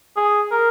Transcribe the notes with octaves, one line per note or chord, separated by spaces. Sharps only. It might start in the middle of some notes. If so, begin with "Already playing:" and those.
G#4
A#4